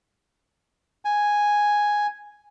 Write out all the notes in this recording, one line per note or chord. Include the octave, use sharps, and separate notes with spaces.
G#5